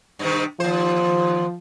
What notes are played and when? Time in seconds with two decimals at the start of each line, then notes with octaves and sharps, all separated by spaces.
0.19 G2 C3 D#3
0.60 D#2 F3 C5